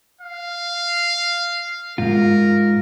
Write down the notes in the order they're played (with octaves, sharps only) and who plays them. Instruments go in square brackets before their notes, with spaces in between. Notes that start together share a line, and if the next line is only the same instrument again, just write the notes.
[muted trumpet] F5
[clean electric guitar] G#2 F4 [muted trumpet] A#4